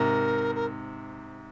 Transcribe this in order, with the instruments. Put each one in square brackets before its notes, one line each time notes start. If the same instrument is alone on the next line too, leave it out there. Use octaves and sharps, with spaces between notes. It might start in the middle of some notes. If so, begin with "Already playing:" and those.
Already playing: [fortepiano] G#2 C3 [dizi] A#4
[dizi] A#4